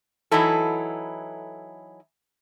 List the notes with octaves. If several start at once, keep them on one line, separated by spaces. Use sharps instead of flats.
E3 F#3 D#4 E4 A4